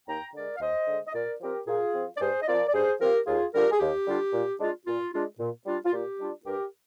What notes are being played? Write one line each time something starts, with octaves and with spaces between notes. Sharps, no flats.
D#2 G5 A#5
D3 G#3 A#4 D5
F5
D#2 C5 D#5
D3 G#3
D#5
A#2 A#4 D5
F3 C4 G4 A#4
A#2 F4 G#4
F3 C4
D5
G2 G#4 C5
D#5
F3 C4 F4 A#4 D5
D5
G2 G#4 C5
F3 C4 F4 G4 A#4
D#2 F4 G#4
D3 G3 D4 F4 G4 A#4
G#4
D#2 G4
D3 G3 D4 F4
A#2
G#3 D4 F4
A#2 F4
G#3 D4 F4
A#2
G3 D4 F4
F4
A#2 G4
G3 D4 F4
G2 G4 A#4